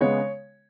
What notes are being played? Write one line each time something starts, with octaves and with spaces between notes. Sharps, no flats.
C#3 G#3 B3 C#5